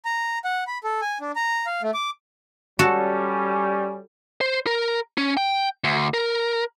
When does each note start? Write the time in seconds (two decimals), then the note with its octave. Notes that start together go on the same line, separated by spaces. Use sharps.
0.05 A#5
0.45 F#5
0.67 B5
0.84 A4
1.01 G#5
1.21 D4
1.36 A#5
1.66 F5
1.82 A3
1.94 D6
2.79 G3 C#4 F#4 A4
4.41 C5
4.67 A#4
5.18 C#4
5.37 G5
5.84 D2
6.14 A#4